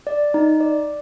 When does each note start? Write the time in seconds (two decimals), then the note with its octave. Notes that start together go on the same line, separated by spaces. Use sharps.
0.07 D5
0.34 D#4
0.60 D5